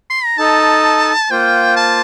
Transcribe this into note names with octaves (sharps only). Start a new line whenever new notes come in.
C6
A#5
D#4 A4 D#5 A5
A#3 F4 C5 G5
A5